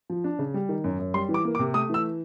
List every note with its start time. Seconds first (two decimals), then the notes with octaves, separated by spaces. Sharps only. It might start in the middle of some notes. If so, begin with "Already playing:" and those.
0.10 F3
0.24 D4
0.39 C#3
0.54 G3
0.69 D#3
0.84 F#2
0.99 F#2
1.14 G3 C6
1.29 E3
1.34 D6
1.45 A#3
1.55 D6
1.59 C3
1.74 A3 D#6
1.90 E3 E6